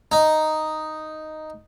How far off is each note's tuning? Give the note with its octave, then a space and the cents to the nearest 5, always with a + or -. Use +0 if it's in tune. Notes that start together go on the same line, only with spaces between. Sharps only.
D#4 +0